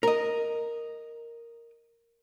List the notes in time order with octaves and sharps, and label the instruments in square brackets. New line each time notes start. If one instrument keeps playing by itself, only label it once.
[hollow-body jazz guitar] A#4 D#5